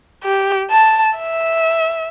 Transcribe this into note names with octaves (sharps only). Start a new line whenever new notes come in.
G4
A5
E5